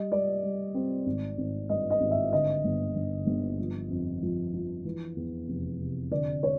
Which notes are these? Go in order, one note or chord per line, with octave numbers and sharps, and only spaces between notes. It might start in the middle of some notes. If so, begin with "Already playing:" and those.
Already playing: G3 D#5
G3 D5
G3
C4
G#1
G#1
G2 D#5
D#5
G#1
E5
D3 D#5
G1
G1
G1
F3
F2
F3
F3
E3
E2
F1
C3
D3 D5
C#5